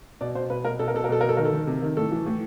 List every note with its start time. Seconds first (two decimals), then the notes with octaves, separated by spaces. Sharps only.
0.21 B2 D5
0.35 B2 C5
0.50 B2 B4
0.65 B2 A#4
0.79 B2 A4
0.88 A#4
0.94 B2 A4
1.04 A#4
1.09 B2 A4
1.21 B2 A#4
1.29 A4
1.37 D#3 A#4
1.45 A4
1.52 D#3
1.67 C3
1.82 D#3
1.97 A2 A4
2.11 E3
2.26 A2